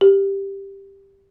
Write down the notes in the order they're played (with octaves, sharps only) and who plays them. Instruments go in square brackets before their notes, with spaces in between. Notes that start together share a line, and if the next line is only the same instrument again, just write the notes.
[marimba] G4